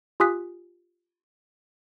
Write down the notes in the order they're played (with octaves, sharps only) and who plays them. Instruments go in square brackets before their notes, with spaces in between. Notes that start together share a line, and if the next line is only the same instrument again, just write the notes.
[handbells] F4 G4 G#5 D#6 F#6 B6